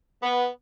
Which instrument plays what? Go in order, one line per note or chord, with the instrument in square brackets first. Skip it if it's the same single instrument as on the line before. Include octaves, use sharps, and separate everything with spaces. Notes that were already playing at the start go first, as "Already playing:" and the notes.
[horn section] B3